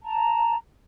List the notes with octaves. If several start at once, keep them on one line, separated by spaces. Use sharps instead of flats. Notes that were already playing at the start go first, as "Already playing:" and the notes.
A5 A#5